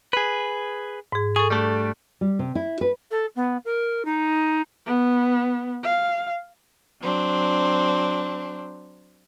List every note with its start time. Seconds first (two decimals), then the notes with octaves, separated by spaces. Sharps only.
0.13 G#4 B4
1.12 G#2 G#4
1.36 G#4 A4 C#6
1.50 G3 A3 D4
2.21 G3
2.39 C3
2.55 E4
2.81 B4
3.11 A4
3.35 B3
3.65 A#4
4.05 D#4
4.86 B3
5.84 F5
7.01 F#3 C4 D4